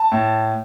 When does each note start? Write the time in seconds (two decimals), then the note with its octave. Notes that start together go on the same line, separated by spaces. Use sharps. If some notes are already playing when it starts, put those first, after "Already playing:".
Already playing: A5
0.12 A2